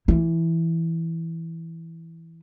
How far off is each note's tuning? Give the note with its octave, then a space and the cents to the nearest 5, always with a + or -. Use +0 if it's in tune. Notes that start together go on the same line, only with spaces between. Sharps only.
E3 +0 E4 +0